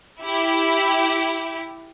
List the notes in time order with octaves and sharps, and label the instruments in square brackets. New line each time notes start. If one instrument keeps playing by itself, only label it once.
[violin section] E4 G4